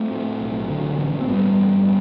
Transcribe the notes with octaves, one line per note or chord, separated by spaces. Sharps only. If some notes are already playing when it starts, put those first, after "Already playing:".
Already playing: A3 C4
A2
B1
D3
A1
C4
G2 G3 B3
A1